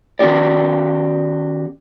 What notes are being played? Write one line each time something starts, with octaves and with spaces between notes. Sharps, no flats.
D#3 B3 C#4 F#4 G4 D5